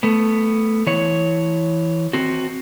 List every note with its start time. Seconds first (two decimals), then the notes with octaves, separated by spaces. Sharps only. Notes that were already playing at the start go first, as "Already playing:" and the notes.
0.03 A3 B3
0.87 E3 C#5
2.13 C4 F#4